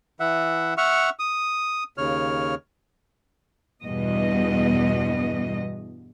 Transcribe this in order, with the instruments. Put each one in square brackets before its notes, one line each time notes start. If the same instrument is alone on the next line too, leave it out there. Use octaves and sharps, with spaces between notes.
[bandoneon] E3 E5 F#5
E5 F#5 C#6 F6
D#6
D#2 C#3 C#5 F6
[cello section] E2 G2 B2 G3 B3 D#5